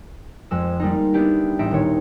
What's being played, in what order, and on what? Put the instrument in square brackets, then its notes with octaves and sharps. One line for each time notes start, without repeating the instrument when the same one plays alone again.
[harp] F2 G#3 E6
G3 G#3 A#3 D#4
B3 D4 E4 G4
A1 D#4 E5 D7
D#1 C#5